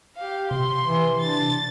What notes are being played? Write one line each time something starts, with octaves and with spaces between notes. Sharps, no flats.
G4 F5
C3 C6
E3
D4 A6